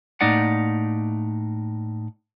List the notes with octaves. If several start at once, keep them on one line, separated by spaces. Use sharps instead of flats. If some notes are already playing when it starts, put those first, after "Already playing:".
A2 A#3 D#4 D5 F#5